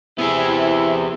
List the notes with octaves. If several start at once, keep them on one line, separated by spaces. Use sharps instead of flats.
C3 B3 E4 G#4